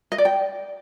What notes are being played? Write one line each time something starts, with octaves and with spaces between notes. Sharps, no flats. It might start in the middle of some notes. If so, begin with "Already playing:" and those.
D#5
D5
G5